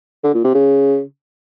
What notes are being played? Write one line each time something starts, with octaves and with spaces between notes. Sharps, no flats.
D3
A#2
C3
C#3